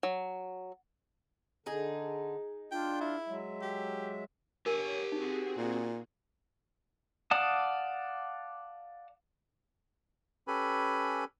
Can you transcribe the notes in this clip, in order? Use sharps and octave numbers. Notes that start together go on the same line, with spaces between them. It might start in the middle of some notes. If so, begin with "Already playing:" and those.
F#3
D3 D#4 G#4
D4 F4 G5
E4
F#3 G#3 E5
G4
G4 A#4 C#5 G#5
C4 D#4 F#4 G#4
A#2
D5 F5 F#5 A5 D#6
C#4 G4 A4 B4 G#5 B5